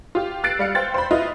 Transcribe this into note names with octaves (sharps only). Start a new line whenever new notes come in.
F4 G4
E6 F#6 A6 C7 D7
G3 F5 C#7
C5 F5 G5 F#6 A6
C5 B5
E4 F4 B4 D#5